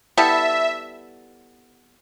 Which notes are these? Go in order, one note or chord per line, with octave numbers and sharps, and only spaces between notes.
G3 B3 E4 A4 E5